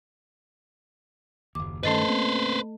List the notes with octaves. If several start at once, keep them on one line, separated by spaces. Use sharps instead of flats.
F#1 D#2 D6
G2 D#3 A3 C#4 A4 B4 C5 D#5
A#3 C4 C#4